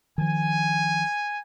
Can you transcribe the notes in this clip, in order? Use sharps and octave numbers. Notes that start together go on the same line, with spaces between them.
D#3 F3 G#5